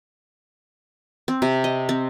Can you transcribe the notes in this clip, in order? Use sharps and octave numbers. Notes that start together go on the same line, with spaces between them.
C4
C3
D#5
C4